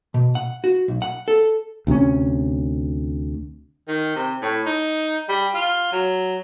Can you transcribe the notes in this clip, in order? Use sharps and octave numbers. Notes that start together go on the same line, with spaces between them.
B2
F#5
F#4
B1
F#5
A4
D2 C3 G3 C#4
D#3
C3
A2
D#4
G3
F4
F#3